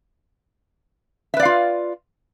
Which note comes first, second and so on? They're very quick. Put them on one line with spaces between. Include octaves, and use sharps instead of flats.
E5 B4 D5 F5 F4